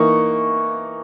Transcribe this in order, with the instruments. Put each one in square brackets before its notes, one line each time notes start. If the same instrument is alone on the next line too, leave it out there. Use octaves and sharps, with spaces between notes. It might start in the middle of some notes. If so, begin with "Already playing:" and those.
Already playing: [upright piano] E3 A#3 D#4 C#6